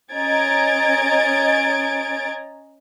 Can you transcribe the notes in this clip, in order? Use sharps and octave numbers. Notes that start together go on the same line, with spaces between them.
C#4 D#5 A#5 G#6 A6 D7